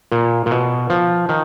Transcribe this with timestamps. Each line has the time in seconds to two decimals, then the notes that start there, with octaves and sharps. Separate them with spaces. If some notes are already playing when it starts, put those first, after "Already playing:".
0.12 A#2
0.46 A#2
0.51 B2
0.90 F3
1.29 D#3